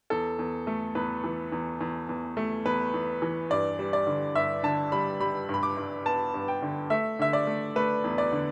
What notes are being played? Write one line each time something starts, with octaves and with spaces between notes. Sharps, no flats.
E2 A4
E2
A3
E2 B4
E3
E2
E2
E2
A3
E2 B4
E2
E3
G2 D5
G3
D5
D3
G2 E5
D3 A5
G3 B5
G3 B5
G2
B5
D6
G2
B3 A5
G2
G5
D3
A3 E5
D3 E5
D5
A3
A3 B4
E2
D5
D3